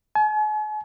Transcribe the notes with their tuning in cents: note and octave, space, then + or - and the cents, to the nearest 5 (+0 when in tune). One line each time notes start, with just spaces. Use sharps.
G#5 +45